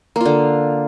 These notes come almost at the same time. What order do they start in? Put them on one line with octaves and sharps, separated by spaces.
A#3 F4 D3